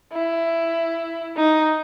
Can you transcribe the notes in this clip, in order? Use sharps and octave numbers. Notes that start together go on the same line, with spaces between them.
E4
D#4